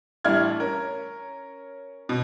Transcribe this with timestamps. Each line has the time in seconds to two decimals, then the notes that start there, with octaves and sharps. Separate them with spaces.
0.24 A1 G3 D4 E4 F6 G#6
0.60 C#4 A#4
2.09 B2